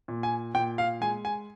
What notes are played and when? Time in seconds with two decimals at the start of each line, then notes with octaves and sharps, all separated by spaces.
0.08 A#2
0.23 G#5
0.54 A#2 G5
0.78 F5
1.01 G#3 G#5
1.25 G#5